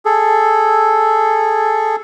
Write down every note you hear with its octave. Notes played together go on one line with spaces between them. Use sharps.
G#4 A4